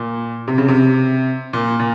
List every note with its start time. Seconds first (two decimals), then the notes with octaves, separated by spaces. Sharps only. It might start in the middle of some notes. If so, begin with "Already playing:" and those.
Already playing: A#2
0.48 C3
0.58 C#3
0.68 C3
1.53 A#2
1.79 A#2